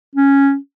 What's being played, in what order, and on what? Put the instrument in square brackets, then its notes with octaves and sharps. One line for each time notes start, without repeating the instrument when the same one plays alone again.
[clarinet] C#4